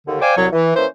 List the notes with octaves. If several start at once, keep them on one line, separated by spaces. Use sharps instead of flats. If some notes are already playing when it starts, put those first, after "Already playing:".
D#2 D3
C5 D5 F5 G5 G#5 D6
C2 F#3 C#5
E3
E3 A#3 C#4 C5